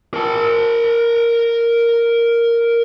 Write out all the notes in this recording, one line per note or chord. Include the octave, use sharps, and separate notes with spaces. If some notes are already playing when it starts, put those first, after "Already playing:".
A#4 A5